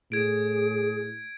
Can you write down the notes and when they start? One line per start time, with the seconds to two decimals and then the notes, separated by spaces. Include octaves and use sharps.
0.12 A2 G#4 G#6 D7